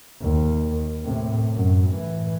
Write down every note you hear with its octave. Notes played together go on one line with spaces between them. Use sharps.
D#2
A2 C3
F#2
A2 E3